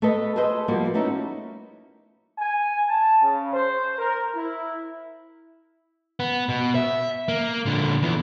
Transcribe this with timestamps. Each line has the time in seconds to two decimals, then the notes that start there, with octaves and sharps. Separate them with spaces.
0.02 A3 B3 A4 B4 D#5
0.36 G#4 A4 B4 C5 D#5
0.68 F3 G3 A#3 B3 F#4
0.94 A3 B3 C#4 D#4 E4 F#4
2.38 G#5
2.89 A5
3.22 C#3
3.53 C5
3.98 A#4
4.34 E4
6.20 B3
6.49 B2
6.75 E5
7.28 A#3
7.66 A#2 D3
8.02 E2 E3